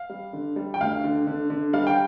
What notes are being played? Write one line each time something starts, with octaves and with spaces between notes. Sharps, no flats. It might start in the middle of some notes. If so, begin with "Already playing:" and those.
Already playing: F5
G3
D3
G3
G5
D2 F5
D3
D3
D3
G3 F5
G5